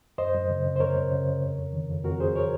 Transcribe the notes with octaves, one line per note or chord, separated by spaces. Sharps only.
F#2 C5 D#5
F#2
C#3
C#3
C5
F#2 A#4 C#5
F#2
C#3
C#3
F2
F2
D#3
F2
F2 F#4 A#4
F2 G#4 C5
A#4 C#5